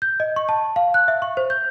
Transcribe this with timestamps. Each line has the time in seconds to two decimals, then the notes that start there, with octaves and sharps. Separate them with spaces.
0.02 G6
0.20 D#5
0.36 C#6
0.49 A5
0.76 F5
0.94 F#6
1.08 E5
1.22 C#6
1.37 C5
1.50 G6